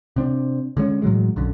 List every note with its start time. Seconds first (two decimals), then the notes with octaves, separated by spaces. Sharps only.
0.16 C3 C4 D4
0.77 D3 G#3 C#4
1.02 A2 E3 F#3 G#3
1.36 B1 F#2 D3